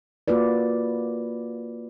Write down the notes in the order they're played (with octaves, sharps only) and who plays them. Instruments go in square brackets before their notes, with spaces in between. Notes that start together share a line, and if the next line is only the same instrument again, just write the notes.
[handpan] A#3 F4 F#4 B4 D5